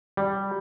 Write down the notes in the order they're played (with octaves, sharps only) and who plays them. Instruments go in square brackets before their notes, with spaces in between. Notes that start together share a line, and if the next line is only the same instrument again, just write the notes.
[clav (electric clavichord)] G3